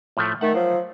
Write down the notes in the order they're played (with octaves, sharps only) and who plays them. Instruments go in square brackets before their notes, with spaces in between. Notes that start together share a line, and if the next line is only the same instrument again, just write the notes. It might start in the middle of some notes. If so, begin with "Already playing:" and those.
[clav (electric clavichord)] A2 F3 A3
[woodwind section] D#3 A3 [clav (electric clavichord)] F#5 A5
[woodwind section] F3 F#3